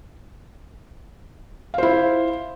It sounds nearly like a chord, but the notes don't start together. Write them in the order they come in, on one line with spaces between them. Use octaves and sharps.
F5 C5 E4